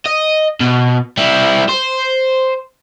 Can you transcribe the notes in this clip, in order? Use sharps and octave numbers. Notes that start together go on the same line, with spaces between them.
D#5
B2
G3 E4
C5